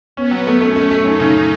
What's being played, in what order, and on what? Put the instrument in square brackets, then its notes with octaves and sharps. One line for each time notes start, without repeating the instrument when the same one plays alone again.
[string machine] B3 [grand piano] C#4
[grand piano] F#3
A3
[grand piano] A3 [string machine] C#4
[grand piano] A3
A3
[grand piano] F#2 [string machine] D#4
[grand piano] C#3
C#3